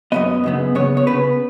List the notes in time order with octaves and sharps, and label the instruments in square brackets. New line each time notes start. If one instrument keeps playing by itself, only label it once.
[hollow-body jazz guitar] F#2 C#3 B3 D#5
F#2 C#3 B3
C#3 B3 C#5
C#5
C#3 B3 B4